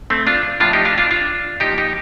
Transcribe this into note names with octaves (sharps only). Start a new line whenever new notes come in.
A3 C4
D4 F4
A2 F3 D4 F4
D#4 G4
D4 F4
D4 F4
D4 F4
A#2 F3 D#4 G4
D#4 G4